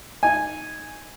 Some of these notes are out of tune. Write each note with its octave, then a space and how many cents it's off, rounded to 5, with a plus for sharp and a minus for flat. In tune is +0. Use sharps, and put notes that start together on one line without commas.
D#4 +0 G#5 -5